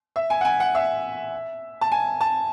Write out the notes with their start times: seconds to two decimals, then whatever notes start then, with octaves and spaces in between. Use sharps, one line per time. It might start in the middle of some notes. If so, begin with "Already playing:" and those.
0.16 E5
0.30 G#5
0.41 F#5
0.45 G#5
0.60 F#5
0.75 E5
1.81 A5
1.92 G#5
2.21 A5